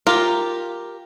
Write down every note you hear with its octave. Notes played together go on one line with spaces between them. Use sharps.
F4 G4 A#4